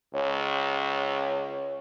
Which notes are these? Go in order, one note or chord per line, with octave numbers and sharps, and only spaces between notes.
C#2 C#5